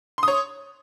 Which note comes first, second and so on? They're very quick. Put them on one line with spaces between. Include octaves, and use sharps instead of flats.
C6 D#6 C#5